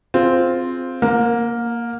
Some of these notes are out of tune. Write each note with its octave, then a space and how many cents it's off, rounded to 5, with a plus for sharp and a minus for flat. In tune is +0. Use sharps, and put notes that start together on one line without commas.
C4 -5 F4 +0 G#4 +15
A#3 +0 F5 +45